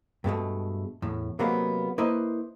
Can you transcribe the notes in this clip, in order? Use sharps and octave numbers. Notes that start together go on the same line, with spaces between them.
G2 B2 G#3 A3
E2 A2
C3 F#3 G#3 A#3 B3
A#3 E4 B4 C5 D#5